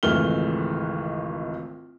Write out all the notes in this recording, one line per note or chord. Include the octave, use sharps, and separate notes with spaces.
G#1 C#2 E3 A3 F6 G7